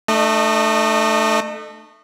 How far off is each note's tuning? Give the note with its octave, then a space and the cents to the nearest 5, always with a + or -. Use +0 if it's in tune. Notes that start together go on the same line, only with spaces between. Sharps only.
A3 +0 D#4 -45 D#5 -30